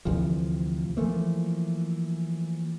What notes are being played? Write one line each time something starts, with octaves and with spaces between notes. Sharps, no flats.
D2 C3 E3 F3
E3 F3 A3 A#3